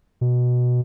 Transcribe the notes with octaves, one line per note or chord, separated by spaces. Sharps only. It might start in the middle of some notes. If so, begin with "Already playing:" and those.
B2